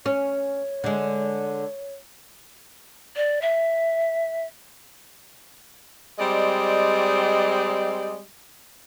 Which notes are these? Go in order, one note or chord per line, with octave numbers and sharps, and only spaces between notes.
C#4 C#5
D3 G#3
D5
E5
G3 G#3 C4 D5 D#5